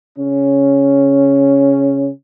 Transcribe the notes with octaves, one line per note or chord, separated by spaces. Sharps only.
C#3 C#4